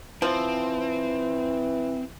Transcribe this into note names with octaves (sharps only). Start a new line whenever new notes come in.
E3 F3 C4